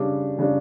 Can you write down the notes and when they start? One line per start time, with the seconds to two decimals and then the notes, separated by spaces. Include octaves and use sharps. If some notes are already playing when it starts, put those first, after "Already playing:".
Already playing: C#3 G3 D4
0.38 C#3 G3 D4